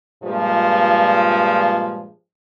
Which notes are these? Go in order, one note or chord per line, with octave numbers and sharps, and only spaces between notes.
G2 A#2 F3 G#3